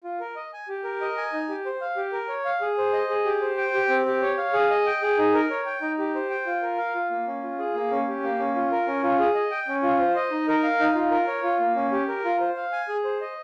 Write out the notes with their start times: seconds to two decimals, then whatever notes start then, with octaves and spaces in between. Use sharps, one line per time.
0.04 F4
0.20 A#4
0.36 D#5
0.53 G#5
0.68 G4
0.84 A#4
1.01 D#5
1.18 G#5
1.33 D#4
1.49 G4
1.66 C5
1.81 F5
1.97 G4
2.13 A#4
2.29 C#5
2.45 F5
2.61 G#4
2.78 C5
2.93 D#5
3.10 G#4
3.25 G4
3.42 C5
3.57 G5
3.74 G4
3.89 C4
4.06 G4
4.22 C#5
4.38 F5
4.53 G#4
4.70 D#5
4.86 G5
5.02 G#4
5.19 D#4
5.34 A#4
5.50 C#5
5.66 G5
5.82 D#4
5.99 G4
6.15 C5
6.30 G5
6.46 F4
6.63 A#4
6.78 F5
6.95 F4
7.11 A#3
7.27 C#4
7.43 F4
7.59 G#4
7.75 A#3
7.91 C#4
8.07 G4
8.24 A#3
8.39 C#4
8.56 F4
8.72 A#4
8.87 C#4
9.03 F4
9.19 G#4
9.35 D#5
9.51 G5
9.68 C#4
9.83 F4
10.00 C5
10.16 D#5
10.31 D#4
10.48 A#4
10.64 F5
10.79 D#4
10.95 F4
11.11 A#4
11.27 C#5
11.43 F4
11.60 A#3
11.75 C#4
11.92 G4
12.08 A#4
12.25 F4
12.40 C5
12.56 F5
12.73 G#5
12.89 G#4
13.04 C5
13.21 D#5